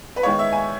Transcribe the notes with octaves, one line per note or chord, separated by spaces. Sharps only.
B4
D#3 G#3 B3 C#5
E5
G#5